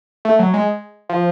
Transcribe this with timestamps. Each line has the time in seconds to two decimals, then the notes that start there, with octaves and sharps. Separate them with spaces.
0.25 A3
0.39 F#3
0.54 G#3
1.09 F3